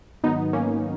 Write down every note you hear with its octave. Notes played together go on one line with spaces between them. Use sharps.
G#2 D#3 F#3 B3 D#4
A#3 C#4